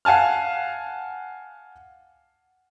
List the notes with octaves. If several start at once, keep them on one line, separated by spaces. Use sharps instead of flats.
F5 F#5 G#5 A5 F6